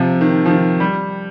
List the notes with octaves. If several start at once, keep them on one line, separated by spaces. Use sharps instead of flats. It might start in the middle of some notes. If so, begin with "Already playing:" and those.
Already playing: C3 F3
D#3
F3
D#3
G3